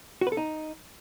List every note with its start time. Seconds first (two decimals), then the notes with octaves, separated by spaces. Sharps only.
0.21 F#4
0.27 B4
0.32 A4
0.37 D#4